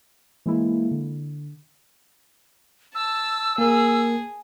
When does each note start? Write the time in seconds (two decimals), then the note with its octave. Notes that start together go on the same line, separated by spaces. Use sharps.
0.46 E3 G#3 A#3 E4
0.91 D3
2.95 A5 E6
3.58 A#3 G#4 A#4